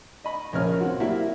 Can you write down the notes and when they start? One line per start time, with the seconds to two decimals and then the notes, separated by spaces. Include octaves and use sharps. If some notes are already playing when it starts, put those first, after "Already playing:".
0.24 D#5 B5
0.53 A#1 C#3 A#4 C#5 F6
0.81 C4 F#4
1.00 F#3 G3 A#3 E4 E5